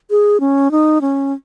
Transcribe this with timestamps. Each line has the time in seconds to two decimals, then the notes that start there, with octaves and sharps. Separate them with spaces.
0.10 G#4
0.40 C#4
0.71 D#4
1.01 C#4